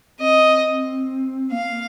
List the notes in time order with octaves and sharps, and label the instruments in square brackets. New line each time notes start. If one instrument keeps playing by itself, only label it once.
[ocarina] C4 [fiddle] D#5
[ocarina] A#3 [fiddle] F5